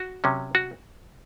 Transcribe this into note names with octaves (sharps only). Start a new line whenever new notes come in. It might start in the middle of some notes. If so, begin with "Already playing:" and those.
Already playing: F#4
C3 F#3 C#4
F#4